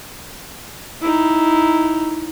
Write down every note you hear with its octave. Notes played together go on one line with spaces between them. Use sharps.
D#4 E4